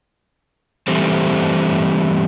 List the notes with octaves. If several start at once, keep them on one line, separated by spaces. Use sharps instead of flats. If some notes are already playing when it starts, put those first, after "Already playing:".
E3 G3 A3 C4 C5